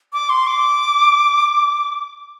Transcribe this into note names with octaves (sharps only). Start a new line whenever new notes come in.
D6
C6
D6